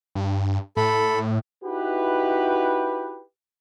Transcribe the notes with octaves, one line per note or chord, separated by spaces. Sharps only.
G2
A2 A4 B5
D#4 E4 F#4 G4 B4